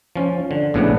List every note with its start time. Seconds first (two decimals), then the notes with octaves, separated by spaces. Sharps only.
0.16 F3 C#4
0.51 D3
0.74 A#1 A2 C#3 B3 D4 F#5